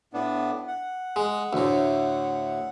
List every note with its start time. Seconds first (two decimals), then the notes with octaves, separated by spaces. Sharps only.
0.14 A2 B3 D4
0.68 F#5
1.16 G#3
1.53 D2 A2